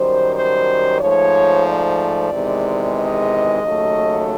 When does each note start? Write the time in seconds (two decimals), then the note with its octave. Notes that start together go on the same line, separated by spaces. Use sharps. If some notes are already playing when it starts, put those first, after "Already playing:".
Already playing: F#2 D#3 G3 C5
0.35 C5
1.00 G#2 F3 A3 C#5
1.66 D5
2.31 E2 C3 D#3 G#3
2.96 D#5
3.61 D#2 C#3 F#3 A3